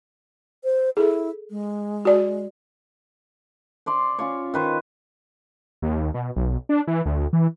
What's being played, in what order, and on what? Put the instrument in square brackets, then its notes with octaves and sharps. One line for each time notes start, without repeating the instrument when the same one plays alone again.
[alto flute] C5
[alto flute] E4 [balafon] G#4 A4
[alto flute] G#3
[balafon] F#4 D5
[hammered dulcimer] C5 D5 C6
C#4 F4 C#5
D#3 B4 C5
[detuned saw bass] D#2
B2
B1
D4
E3
D2
E3